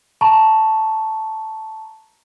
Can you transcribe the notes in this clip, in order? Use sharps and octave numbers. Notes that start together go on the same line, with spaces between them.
A5 A#5 C#6